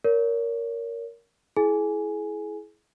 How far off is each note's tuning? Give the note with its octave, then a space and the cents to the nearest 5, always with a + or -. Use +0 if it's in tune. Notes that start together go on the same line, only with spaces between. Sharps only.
A#4 +0 C#5 +35
E4 +0 G#4 +30 G#5 +5